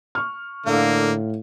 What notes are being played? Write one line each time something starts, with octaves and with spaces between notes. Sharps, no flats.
C#6 F6
A2 D3 A#3 F5